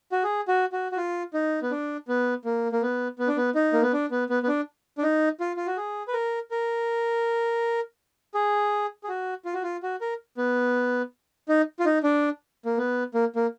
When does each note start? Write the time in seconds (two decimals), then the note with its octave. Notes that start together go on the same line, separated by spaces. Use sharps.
0.12 F#4
0.24 G#4
0.48 F#4
0.73 F#4
0.92 F#4
0.97 F4
1.34 D#4
1.62 B3
1.71 D4
2.08 B3
2.45 A#3
2.72 A#3
2.82 B3
3.19 B3
3.28 D4
3.37 B3
3.55 D#4
3.73 A#3
3.82 B3
3.93 D4
4.11 B3
4.29 B3
4.43 B3
4.48 D4
4.98 D4
5.03 D#4
5.40 F4
5.56 F4
5.67 F#4
5.77 G#4
6.08 B4
6.13 A#4
6.51 A#4
8.34 G#4
9.04 G#4
9.08 F#4
9.45 F4
9.54 F#4
9.63 F4
9.83 F#4
10.01 A#4
10.37 B3
11.49 D#4
11.80 F4
11.86 D#4
12.03 D4
12.66 A#3
12.78 B3
13.14 A#3
13.36 A#3